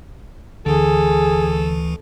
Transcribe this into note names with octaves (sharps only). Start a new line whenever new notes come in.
D2 D3 E3 G#4 A4